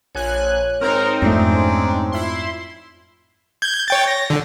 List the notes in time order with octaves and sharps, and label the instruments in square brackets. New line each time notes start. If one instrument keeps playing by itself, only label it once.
[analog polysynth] A#1 G#5 F#6 [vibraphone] C#5
[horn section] G#2 A#4 [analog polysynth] C4 D#4
[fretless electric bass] F2 G#2 A3 [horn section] G#3 C#4 D4 [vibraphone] A#5
[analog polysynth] E4 C6 [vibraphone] F4
[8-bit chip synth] G6 G#6
C#5 G5 A6
A#6
D3